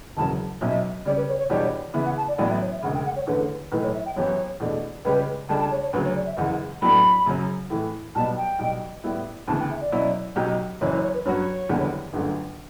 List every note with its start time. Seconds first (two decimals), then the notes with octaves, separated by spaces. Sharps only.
0.16 E1 E2 C#3 F#3 C#4 A5
0.61 B1 B2 F#3 C#4 E5
1.05 C#3 G3 C#4 D5
1.16 B4
1.28 C#5
1.38 C#5
1.49 E2 B2 G3 D4 G4 C#5
1.94 C#3 E3 B3 E5
2.05 F#5
2.17 A5
2.27 D5
2.38 A1 A2 F#3 B3 D5
2.50 E5
2.61 C#5
2.71 E5
2.83 E1 D2 C#3 F#5
2.94 G5
3.05 F#5
3.15 C#5
3.27 E2 D3 A3 C#4 B4
3.71 B1 A2 E3 A3 B4
3.83 C#5
3.93 E5
4.05 G5
4.15 F#2 E3 B3 E4 G4 C#5
4.60 E2 B2 A3 D4
5.04 C#2 C#3 G3 C#4 G4 B4
5.49 C#2 C#3 G3 D4 A4 A5
5.60 A5
5.71 C#5
5.82 C#5
5.93 D2 C#3 F#3 B4
6.04 C#5
6.15 D5
6.26 E5
6.37 F#1 E2 C#3 F#5
6.81 A2 F#3 B3 D4 A4 B5
7.26 F#2 C#3 F#3 C#4
7.70 A2 E3 A3
8.15 B1 B2 G3 B3 A5
8.37 G5
8.59 B1 B2 G3
9.04 A2 G3 B3 E4
9.47 D2 C#3 E3 B3 A5
9.59 G5
9.70 E5
9.80 D5
9.92 B2 F#3 C#4 E4
10.36 B1 B2 F#3 C#4 G4
10.81 F#1 F#2 E3 C#5
10.92 C#5
11.03 C#5
11.14 B4
11.25 G2 F#3 C#4 F#4 C#5
11.69 F#1 E2 D3 G3 B3
12.13 G1 F#2 D3 A3